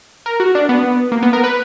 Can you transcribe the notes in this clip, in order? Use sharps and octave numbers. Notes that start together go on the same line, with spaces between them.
A#4
F#4
D4
B3
A#3
B3
A#4
B4